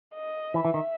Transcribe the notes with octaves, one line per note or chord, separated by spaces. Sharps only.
D#5
E3 E5
E3
D#3